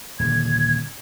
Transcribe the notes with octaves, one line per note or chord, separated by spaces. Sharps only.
D#1 D3 G#6